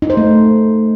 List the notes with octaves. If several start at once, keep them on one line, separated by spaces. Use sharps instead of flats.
D#4
C5
A3